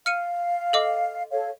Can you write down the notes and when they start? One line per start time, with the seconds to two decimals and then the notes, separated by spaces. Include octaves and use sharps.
0.06 F5 F6 C#7 D#7
0.73 A4 D#5 D6
1.31 A4 C#5 F5